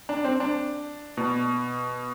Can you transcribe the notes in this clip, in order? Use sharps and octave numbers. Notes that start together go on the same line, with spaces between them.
D4
C4
D4
B2